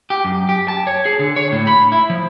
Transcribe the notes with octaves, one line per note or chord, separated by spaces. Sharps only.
G4
F#2
G4
A5
C#5
G#4
D3
C#5
A2
B5
E4
F3